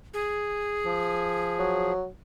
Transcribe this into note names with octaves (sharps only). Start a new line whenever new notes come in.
G#4
F3
F#3